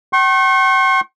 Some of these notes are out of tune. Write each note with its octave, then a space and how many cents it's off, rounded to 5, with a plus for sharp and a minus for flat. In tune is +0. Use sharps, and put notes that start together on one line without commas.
G5 -45 C#6 -45